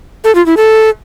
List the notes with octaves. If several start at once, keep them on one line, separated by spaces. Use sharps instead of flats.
A4
F4
E4
A4